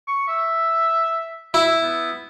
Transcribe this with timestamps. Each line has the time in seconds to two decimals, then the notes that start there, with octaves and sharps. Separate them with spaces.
0.08 C#6
0.28 E5
1.54 E4 E5
1.83 B3